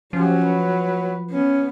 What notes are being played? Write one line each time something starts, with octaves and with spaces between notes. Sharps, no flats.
F3 F#3 C#4 G4
B4
B3 C#4